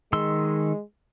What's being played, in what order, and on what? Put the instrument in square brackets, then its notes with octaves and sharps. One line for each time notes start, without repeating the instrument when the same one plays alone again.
[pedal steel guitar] D#3 C6 E6 [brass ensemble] G#3